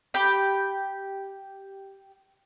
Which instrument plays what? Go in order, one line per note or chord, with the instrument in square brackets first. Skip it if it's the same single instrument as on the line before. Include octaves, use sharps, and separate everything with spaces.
[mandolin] G4 B5